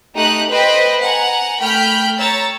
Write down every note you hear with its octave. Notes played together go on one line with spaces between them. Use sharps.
A3 D#4 G4 A#5 D#6 F#6
B4 C5 D#5 G5 B5
F#5 G#5 A#5
A3 G5 B5 F6 G6 B6
C#5 A#5 E6 A6